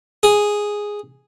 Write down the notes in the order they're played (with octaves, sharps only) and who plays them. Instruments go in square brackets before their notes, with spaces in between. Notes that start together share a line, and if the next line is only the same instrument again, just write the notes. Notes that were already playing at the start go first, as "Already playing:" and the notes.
[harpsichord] G#4